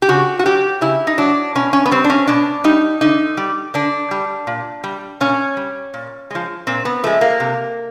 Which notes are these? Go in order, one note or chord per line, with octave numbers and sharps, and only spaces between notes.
G4
C#3 F#4
F#4
F#3 G4
C#3 E4
D#4
F#3 D4
B2 C#4
C#4
B3
G3 C4
D4
C#4
B2 D4
G3 D#4
D3 D#4
G3
D3 D4
G3
A#2
G3
A#2 C#4
G3
A#2
F3 G#3
A#2 C4
B3
F3 G#3 A3
A#3
C3